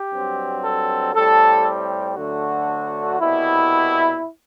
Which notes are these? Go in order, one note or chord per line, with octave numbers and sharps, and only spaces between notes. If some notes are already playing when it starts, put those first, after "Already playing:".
Already playing: G4
G2 F#3 C4
A4
A2 G3 C4 A4
G4
D2 D3 F#3 A3 F#4
C2 B2 G3 E4